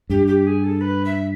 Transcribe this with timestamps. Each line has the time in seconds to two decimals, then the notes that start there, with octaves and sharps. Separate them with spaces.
0.10 G2 G4
0.27 G4
0.46 G#4
0.63 A4
0.80 B4
1.04 E5